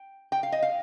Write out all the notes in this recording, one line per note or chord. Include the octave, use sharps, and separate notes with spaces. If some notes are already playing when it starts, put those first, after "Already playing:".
Already playing: G5
G5
F5
D#5
F5